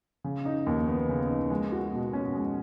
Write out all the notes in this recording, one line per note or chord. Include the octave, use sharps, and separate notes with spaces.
C#3
D#4
D#2
B3
C#3
D#4
G#3
F#4
B2
C#4
G#3